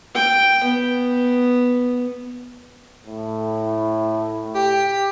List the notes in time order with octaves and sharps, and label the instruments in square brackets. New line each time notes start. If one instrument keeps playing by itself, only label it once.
[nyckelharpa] G5
B3
[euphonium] A2
[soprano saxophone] G4